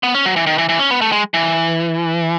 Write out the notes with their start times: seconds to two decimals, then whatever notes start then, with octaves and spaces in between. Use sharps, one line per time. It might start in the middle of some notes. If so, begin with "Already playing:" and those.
0.03 B3
0.14 C#4
0.25 F#3
0.36 E3
0.47 D#3
0.58 E3
0.69 E3
0.79 C#4
0.91 B3
1.01 A3
1.12 G#3
1.34 E3